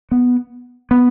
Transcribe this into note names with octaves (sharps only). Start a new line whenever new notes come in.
B3
B3